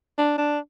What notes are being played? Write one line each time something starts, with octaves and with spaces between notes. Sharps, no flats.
D4
D4